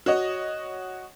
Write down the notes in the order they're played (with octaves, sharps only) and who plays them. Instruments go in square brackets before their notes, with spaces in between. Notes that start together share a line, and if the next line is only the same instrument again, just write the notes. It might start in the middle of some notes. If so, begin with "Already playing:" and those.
[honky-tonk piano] F#4 C#5 D#5